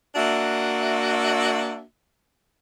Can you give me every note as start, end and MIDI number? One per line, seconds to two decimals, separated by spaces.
0.15 1.82 58
0.15 1.82 62
0.15 1.82 66
0.15 1.82 76